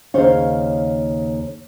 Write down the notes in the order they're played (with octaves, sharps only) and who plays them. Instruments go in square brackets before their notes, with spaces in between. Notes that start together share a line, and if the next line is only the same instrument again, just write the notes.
[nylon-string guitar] D#2 C#3 C5 C#5 F5